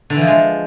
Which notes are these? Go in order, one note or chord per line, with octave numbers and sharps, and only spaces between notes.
D3
E3
F3
G#3